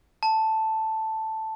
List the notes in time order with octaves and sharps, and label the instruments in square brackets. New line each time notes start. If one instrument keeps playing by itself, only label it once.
[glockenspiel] A5